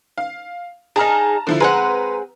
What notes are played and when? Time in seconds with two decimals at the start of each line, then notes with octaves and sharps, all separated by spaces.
0.18 F5
0.96 D#4 G#4 A5 A#5 F6
1.47 D3 F3 E4
1.60 G#3 C4 B4 F#5 A#5